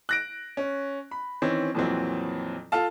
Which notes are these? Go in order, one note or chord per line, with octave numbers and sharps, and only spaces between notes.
F#6 A#6 D7
C#4
B5
D#3 E3 C4 C#4
F2 A#2 E3 F#3 C4
F4 A4 F5 A5